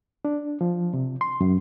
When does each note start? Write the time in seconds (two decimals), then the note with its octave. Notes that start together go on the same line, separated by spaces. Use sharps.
0.25 D4
0.61 F3
0.94 C3
1.21 C6
1.41 F#2